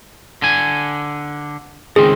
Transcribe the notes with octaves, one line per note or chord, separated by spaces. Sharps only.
D3 G#5
C#2 D#3 C4 G#4